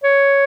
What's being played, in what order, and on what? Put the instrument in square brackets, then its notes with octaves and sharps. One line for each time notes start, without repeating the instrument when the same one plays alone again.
[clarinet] C#5